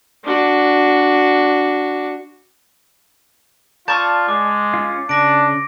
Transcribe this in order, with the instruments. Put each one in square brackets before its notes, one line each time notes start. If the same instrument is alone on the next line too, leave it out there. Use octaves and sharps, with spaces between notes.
[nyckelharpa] D4 F#4
[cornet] F4 [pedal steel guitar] D5 [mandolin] A5 C#6 D#6 [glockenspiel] G6 A6
[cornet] G#3 [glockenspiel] D6
[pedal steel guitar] C#4 F4
[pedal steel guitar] C#3 [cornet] D4 [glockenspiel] D6 A#6 D7